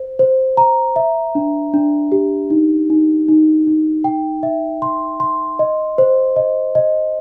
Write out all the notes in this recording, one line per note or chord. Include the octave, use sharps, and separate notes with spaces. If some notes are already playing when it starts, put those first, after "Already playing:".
Already playing: C5
C5
A#5
E5
D4
D4
G4
D#4
D#4
D#4
D#4
G5
E5
C6
C6
D#5
C5
D#5
D#5